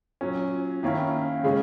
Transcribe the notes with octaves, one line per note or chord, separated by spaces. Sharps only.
A#2 F#3 C#4
D#3 A#3 C#4 E4
C#3 G#3 C#4